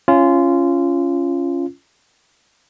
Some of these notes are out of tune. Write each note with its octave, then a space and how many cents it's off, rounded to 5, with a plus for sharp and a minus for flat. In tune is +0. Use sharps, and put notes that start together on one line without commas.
C#4 +0 F4 -20